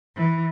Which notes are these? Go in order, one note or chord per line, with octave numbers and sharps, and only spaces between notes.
E3